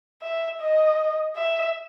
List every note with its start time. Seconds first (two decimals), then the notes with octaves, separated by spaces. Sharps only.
0.23 E5
0.61 D#5
1.36 E5